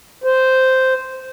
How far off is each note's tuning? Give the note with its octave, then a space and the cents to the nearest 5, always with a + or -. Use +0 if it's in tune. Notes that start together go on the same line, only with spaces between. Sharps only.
C5 -5